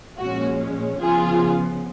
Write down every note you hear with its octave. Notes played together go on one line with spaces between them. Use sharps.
A#2 F3 G#3 C#4 F#4
C#3 F3 B3 F4 G#4